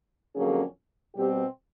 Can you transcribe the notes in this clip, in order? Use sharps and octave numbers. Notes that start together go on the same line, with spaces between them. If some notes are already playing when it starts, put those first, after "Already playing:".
F2 D3 F#3 A#3 C#4 G#4
B2 G3 C4 G4